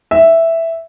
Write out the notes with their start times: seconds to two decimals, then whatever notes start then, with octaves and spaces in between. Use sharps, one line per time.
0.11 E5